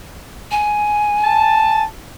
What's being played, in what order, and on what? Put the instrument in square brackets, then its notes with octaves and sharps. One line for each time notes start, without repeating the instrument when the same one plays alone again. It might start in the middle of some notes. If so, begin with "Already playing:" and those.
[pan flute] G#5
[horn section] A5